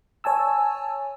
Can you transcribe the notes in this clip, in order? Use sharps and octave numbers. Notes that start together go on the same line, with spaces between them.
C#5 G#5 A5 E6